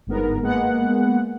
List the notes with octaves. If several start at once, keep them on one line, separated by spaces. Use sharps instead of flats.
G1 G#2 B3 A#4
G#3 A#3 B3 F#5